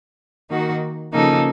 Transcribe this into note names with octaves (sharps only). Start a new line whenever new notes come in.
D#3 A#3 D#4 F#4
C#3 F3 A#3 D#4 A4